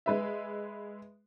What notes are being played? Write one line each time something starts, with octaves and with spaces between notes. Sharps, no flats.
G#3 B4 E5